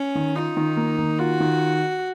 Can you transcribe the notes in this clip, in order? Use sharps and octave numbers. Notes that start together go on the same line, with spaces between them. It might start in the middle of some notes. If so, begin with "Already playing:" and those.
Already playing: C#4
D#3
D#4 F4
D#3
A#3
D#3
F4 F#4
D#3